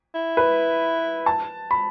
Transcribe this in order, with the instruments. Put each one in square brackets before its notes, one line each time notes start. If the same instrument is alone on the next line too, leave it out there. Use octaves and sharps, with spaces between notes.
[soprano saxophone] E4
[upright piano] B4
A5
B5